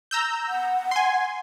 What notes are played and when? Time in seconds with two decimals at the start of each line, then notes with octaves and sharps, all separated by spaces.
0.11 A#5 E6 G6
0.48 F#5
0.91 G#5 C6